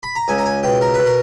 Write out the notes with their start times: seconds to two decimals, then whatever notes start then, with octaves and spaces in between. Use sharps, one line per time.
0.03 B5
0.16 A#5
0.28 C#2 G#5
0.38 A#5
0.46 G#5
0.63 B2 G5
0.81 A#4
0.94 B4
0.99 B2
1.06 A#4